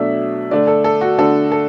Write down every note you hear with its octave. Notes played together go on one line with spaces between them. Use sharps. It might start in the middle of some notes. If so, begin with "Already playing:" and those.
Already playing: B2 F#3 A3 D4 E5
D3 A3 D4 D5
A4
A4
F#4
D3 A3 D4 A4
A4